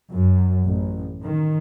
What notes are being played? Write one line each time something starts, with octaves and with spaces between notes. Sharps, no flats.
F#2
A1
D#3